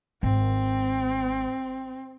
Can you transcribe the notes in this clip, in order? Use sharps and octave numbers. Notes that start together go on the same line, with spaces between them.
G#1 C4